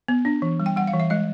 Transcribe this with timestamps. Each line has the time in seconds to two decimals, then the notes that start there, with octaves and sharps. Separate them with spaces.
0.08 B3
0.25 D4
0.42 E3
0.60 G3
0.66 G5
0.76 G3 F#5
0.87 F5
0.93 E3
1.00 E5
1.10 G#3 D#5